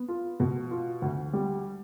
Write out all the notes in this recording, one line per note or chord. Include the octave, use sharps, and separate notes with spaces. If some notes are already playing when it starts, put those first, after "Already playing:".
Already playing: B3
F4
B2
F4
D2
G3